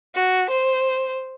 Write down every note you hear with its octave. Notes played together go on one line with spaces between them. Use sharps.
F#4
C5